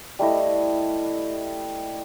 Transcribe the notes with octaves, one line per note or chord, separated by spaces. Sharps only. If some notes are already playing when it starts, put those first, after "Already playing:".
G3 A3 E4 D#5